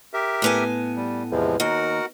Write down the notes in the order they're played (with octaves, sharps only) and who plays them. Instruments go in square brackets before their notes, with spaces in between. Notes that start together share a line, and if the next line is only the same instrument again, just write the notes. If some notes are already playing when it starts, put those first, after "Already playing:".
[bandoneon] G4 A#4 E5
[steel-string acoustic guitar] A2 B3 G#5
[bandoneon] G3
[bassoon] E2 [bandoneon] C3 F3 G#3
[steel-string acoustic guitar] D#2 [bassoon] D#4 [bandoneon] F#4 A#4 F#5